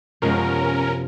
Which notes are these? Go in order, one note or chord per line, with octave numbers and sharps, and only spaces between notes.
F#2 C3 F3 G#3 B3 C#4 A#4